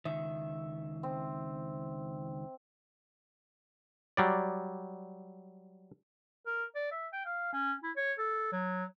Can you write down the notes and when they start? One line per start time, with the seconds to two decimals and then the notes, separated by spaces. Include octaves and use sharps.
0.05 C#2 D#3 E5
1.03 C4
4.17 F#3 G3 D5
6.47 A#4
6.75 D5
6.92 E5
7.13 G5
7.26 F5
7.53 C#4
7.83 E4
7.97 C#5
8.18 A4
8.53 F#3